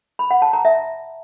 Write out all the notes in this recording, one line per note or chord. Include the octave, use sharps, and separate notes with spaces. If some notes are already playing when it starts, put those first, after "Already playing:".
B5
F#5
A5
A#5
E5